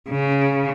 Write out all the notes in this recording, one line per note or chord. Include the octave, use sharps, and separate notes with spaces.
C#3